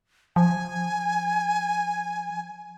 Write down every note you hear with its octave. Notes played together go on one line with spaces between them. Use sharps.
F3 G#5